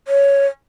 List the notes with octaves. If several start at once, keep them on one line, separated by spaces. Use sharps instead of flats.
C#5